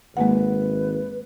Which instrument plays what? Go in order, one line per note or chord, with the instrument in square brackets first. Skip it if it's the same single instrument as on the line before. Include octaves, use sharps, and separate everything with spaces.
[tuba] G#1 [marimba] G#3 A#3 F#5 [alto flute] B4